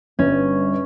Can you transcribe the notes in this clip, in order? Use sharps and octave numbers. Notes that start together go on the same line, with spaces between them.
G1 G2 C#4